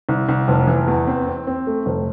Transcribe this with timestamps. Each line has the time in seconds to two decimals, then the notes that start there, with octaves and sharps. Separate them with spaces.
0.09 C2
0.29 C2
0.48 F1
0.67 E3
0.87 E2
1.07 C4
1.27 C4
1.47 C4
1.67 A3
1.86 F1